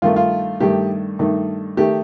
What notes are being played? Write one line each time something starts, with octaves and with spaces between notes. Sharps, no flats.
G2 D#3 A3 D#4 F4
F4
G2 D#3 A3 D#4 G4
G2 D#3 A3 D#4
D#3 A3 D#4 G4